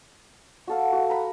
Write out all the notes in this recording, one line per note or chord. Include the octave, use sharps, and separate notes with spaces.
F#4 A4 F5
F#4
A#5 B5